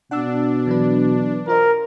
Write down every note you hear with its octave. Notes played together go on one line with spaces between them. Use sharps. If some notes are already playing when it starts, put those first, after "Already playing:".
B2 D4 F#5 E6
E3 F#3 B4
F4 A#4 C5 D#5